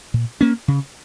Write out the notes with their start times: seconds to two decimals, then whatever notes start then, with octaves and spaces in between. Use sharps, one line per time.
0.14 A#2
0.41 A#3 C#4
0.68 C#3